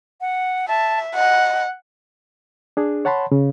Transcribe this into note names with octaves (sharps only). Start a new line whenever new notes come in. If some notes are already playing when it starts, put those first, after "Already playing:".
F#5
E5 A5
D#5 F#5
D4 G#4
C#5 F#5 A5 B5 C6
C#3